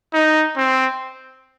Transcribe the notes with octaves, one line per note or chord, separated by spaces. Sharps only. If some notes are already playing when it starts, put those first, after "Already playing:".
D#4
C4